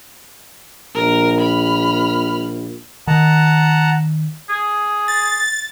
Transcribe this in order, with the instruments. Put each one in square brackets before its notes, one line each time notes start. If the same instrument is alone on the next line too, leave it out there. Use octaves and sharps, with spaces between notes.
[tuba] A#1 [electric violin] A#4
[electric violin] B5 F6
[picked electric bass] D#3 [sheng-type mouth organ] F#5 A5 A#5
[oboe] G#4
[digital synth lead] A6